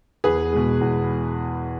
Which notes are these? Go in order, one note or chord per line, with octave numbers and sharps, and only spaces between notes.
E2 G#4 B4
B2 G#3
E2